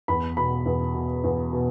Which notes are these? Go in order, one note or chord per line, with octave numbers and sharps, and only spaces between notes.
E2 B5
B2 B5
E2
B2
E2
B2